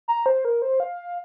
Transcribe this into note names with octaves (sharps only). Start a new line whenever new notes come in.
A#5
C5
A#4
C5
F5